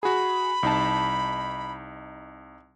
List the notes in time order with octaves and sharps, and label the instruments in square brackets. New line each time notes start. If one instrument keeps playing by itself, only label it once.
[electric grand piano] F#4 G#4 [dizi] B5
[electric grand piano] C2 D#4 A5